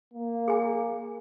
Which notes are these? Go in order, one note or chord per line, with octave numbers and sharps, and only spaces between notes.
A#3
G#4 G#5